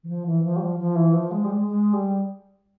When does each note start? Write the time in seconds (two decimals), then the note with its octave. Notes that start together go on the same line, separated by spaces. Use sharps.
0.03 E3
0.08 F3
0.26 E3
0.43 F3
0.56 G3
0.61 F3
0.79 F3
0.95 E3
1.13 F3
1.31 G#3
1.44 G3
1.49 G#3
1.66 G#3
1.93 G3